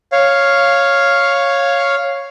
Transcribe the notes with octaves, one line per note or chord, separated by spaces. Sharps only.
C#5 F5